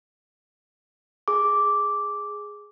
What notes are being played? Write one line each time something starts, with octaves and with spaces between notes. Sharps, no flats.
G#4 D6